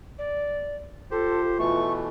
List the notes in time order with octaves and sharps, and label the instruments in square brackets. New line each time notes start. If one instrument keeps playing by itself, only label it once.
[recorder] D5
[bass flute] F4 [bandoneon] G4 C5 [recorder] A4
[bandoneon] B2 E3 A3 [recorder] C#6